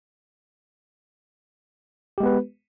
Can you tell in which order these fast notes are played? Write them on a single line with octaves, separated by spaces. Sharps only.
G4 G#3 B3 B4